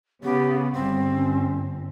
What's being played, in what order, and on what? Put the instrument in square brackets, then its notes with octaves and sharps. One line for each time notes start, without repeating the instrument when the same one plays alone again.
[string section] C#3 [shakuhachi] B3 [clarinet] G4
[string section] G1 [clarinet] G3 [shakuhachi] C4
[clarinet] C#4